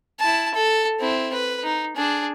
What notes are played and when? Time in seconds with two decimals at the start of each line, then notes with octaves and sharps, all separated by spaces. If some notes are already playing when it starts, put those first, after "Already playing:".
0.20 E4 A5
0.55 A4
1.00 C4 E4
1.33 B4
1.63 D#4
1.96 D4 G#4